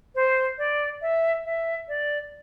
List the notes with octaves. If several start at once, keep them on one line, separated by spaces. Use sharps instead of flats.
C5
D5
E5
E5
D5